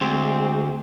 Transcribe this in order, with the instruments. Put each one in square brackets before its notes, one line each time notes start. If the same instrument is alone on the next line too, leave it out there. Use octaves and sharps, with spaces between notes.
[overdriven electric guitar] D2 [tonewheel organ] G#3 [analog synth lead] C4